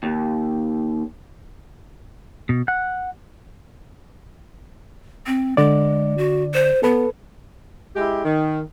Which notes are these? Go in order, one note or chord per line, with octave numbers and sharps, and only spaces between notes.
D#2
B2
F#5
C4
D3 G#3 D5
F#4
C5
B3 A4 B4
G#3 E4 G4
D#3